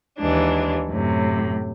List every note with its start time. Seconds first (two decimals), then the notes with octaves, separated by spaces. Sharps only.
0.18 D#2 E3 G#3 D4
0.90 F#2 A2 C3